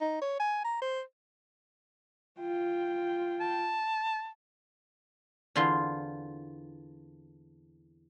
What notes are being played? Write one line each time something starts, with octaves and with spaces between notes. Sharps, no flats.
D#4
C#5
G#5
A#5
C5
F4 G5
A5
E2 D3 C4 F4 F5 C6